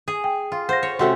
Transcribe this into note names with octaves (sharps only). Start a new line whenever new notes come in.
G#4
G5
F4
C5 F#5 A#6
C#5
C3 A3 C#4 F#4 F#5 C6